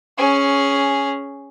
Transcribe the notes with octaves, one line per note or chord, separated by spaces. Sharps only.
C#4 G#4